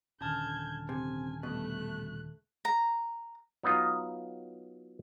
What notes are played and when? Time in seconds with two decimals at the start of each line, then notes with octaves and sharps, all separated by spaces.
0.21 D#1 D3 C#4 A5 F6 G6 G#6
0.89 C3 G#5
1.43 G2 B2 A3 F#6
2.65 A#5
3.63 F#3 B3 D#4 F4 D#5